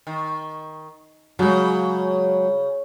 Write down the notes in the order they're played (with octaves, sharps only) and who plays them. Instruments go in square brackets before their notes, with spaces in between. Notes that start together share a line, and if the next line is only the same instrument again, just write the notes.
[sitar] D#3
[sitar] C#3 [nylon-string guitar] F#3 G#3